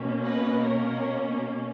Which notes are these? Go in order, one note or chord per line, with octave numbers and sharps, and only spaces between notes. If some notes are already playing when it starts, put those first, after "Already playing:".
Already playing: B2 A#3 C#4
B4 D#5
A#4 C#5